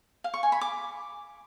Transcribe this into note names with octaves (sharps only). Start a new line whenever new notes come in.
F5
C#6
G#5
B5
D6